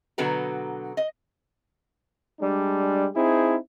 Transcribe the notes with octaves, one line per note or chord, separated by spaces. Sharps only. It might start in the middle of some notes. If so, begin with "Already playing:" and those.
B2 D3 F#3 F#4 B4 A#5
D#5
G3 G#3 D4
C4 D#4 E4 G#4